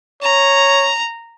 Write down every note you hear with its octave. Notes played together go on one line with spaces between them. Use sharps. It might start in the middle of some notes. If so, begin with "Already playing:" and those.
C#5 A#5